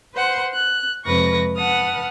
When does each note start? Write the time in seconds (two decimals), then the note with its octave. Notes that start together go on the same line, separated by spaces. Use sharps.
0.14 B4 C5 F#5 C6
0.52 F#6
1.05 F2 C3 G#3 B4 C#6 A#6
1.56 B4 F#5 A5 D#6 F6